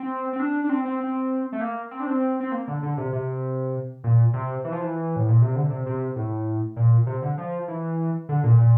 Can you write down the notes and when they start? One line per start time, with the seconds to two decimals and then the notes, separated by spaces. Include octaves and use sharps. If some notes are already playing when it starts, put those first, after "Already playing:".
Already playing: C4
0.33 C4
0.40 D4
0.64 D4
0.69 C4
0.85 C4
1.00 C4
1.52 A3
1.61 A#3
1.91 C4
2.00 D4
2.07 C4
2.40 C4
2.52 A#3
2.68 D3
2.83 D3
2.97 C3
3.13 C3
4.04 A#2
4.33 C3
4.64 E3
4.72 F3
4.81 E3
5.16 A2
5.29 A#2
5.42 C3
5.56 D3
5.70 C3
5.86 C3
6.16 A2
6.76 A#2
7.06 C3
7.22 D3
7.38 F3
7.68 E3
8.29 D3
8.43 A#2
8.58 A#2